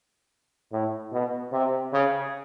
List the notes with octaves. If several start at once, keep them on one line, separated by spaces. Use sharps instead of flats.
A2
B2
C3
C#3